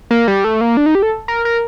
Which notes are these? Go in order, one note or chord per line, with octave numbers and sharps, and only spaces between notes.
A#3
G3
A3
A#3
D4
D#4
G4
A4
A#4
A#4